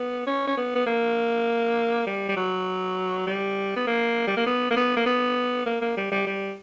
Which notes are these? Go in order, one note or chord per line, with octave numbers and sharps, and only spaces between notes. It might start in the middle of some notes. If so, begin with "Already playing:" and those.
Already playing: B3
C#4
C#4
B3
B3
A#3
G3
G3
F#3
G3
B3
A#3
G3
A#3
B3
A#3
B3
A#3
B3
A#3
A#3
G3
G3
G3